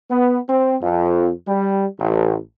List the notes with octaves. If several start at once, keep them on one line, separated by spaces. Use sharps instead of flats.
B3
C4
F2
G3
A1